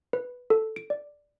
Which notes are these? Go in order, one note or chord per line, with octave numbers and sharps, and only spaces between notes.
B4
A4
D7
D5